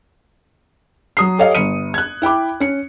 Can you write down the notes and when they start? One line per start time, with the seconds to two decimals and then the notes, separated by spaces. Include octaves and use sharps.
1.17 F#3 D#6 C7
1.38 G4 A4 C#5 D#5 F5
1.55 G1 C#7 D#7
1.94 F#6 G#6
2.22 E4 G5 B5 D6
2.60 C#4 C#7